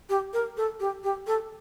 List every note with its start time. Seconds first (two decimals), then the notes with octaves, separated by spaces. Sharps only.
0.09 G4
0.33 A#4
0.57 A4
0.80 G4
1.04 G4
1.27 A4